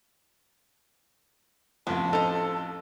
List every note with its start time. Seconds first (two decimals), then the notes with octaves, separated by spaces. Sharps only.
1.87 A1 F2 B3 A5
2.13 D#4 A4 C5